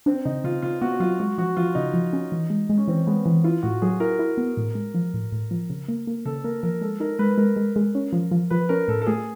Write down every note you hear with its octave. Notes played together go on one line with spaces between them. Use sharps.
C4 D4
C#3 D#4
C#3 F4
C#3 F4
B3 F#4
F#3 F4
G#3 F#4
F3 F#4
F3 F4
C#3 D#4
F3
C#4
E3
G#3
G#3
C#4
E3 C4
G#3 B3
E3
E4 F4
A2 F#4
F#3 G#4
E4 A#4
E4
B3
A2
G#3
F3
A2
A2
F3
C#3
A#3
A#3
C#3 A4
A#3 A#4
F3 A#4
G#3 A4
D#4 A#4
G#3 B4
G#3 A#4
G#3
G#3
C#4
F3
F3
F3 B4
C#4 A#4
A2 A4
A4
A3 G#4